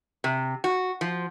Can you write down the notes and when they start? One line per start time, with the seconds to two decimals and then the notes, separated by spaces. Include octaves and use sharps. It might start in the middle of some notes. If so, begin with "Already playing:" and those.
0.24 C3
0.64 F#4
1.01 F3